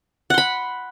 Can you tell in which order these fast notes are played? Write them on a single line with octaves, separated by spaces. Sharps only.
F#5 C6 B5